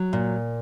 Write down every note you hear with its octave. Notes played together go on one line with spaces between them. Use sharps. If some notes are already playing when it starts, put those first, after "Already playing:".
Already playing: F#3
A#2